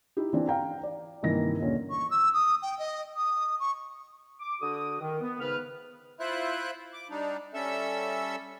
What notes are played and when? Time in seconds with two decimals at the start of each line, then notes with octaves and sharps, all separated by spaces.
0.17 D#4 E4 G4
0.33 E3 C4 D4
0.47 F5 G5 A#5
0.83 D5
1.23 G2 C3 D#3 E3 A#3 A#6
1.60 D#2 A#2 D3 C#4
1.90 C#6
2.11 E6
2.34 D#6
2.62 G5
2.79 D#5
3.16 D#6
3.60 C#6
4.40 D6
4.61 D3 F#4 D#6
5.00 D#3
5.20 B3
5.41 G#2 C#3 B4 F6
6.20 E4 F4 C5 E5 F#6
6.93 D6
7.10 G3 D4 D#4
7.54 G3 C#4 A4 E5 E6